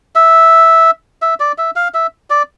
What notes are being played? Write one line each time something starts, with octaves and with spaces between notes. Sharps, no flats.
E5
E5
D5
E5
F5
E5
D5